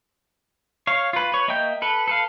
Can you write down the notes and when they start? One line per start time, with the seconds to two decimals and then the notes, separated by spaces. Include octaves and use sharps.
0.87 C#5 F5
1.13 F4 B4
1.32 B4 C#5
1.48 A#3 D#5 E5 G5 G6
1.82 A4 B4
2.08 A4 B4 F5